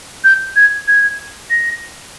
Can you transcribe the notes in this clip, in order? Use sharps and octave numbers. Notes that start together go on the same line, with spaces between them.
G6
G#6
G#6
A#6